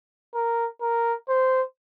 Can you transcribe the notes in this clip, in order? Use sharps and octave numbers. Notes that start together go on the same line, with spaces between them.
A#4
A#4
C5